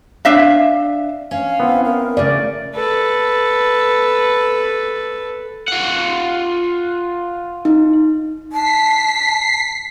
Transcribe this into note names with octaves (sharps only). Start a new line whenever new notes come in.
D4 E5 F5
C#4 F5
B3 C4 E4
A#4
C#3 A3 D5
A4 B4
F4 F#5
D#4
A5 B6 C7